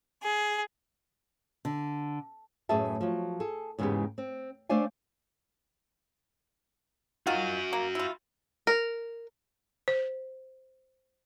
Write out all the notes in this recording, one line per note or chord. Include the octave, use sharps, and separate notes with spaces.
G#4
D3
F#2 A2 G#4 B4 E5 A5
F3 F#3
G#4 A4
E2 G#2 C#3 G#3 B3 G4
C4
A3 D4 C5 D5 F5 G#5
D#3 F4 F#4 F#5 G#5
A#3
E4 F4
A#4
C5